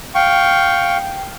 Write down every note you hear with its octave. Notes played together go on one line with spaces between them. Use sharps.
F5 G5 C#6